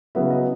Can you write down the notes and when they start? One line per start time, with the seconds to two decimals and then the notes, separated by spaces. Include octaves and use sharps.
0.15 C#3 F#3 B3 E4 E5
0.30 D#5